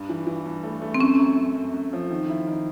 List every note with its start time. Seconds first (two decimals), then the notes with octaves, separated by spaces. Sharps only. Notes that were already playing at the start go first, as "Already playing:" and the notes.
Already playing: G2
0.09 E3
0.27 E3
0.46 G2
0.63 A3
0.82 A3
0.94 C4
1.00 F#2 C#4
1.19 F#2
1.37 F#2
1.55 F#2
1.74 F#2
1.93 F3
2.10 D#3
2.29 E4
2.47 D#3